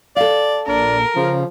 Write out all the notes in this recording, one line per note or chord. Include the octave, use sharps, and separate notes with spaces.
A4 D5 F5
A#1 D4 A#4
C#3 F3